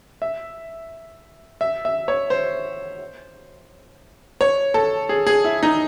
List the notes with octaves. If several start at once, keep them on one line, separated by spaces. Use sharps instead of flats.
E5
E5
E5
C#5
C5
C#5
A4
G#4
G#4
E4
D#4